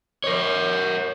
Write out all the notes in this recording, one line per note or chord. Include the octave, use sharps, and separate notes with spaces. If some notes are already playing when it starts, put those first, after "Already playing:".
A#4 C#5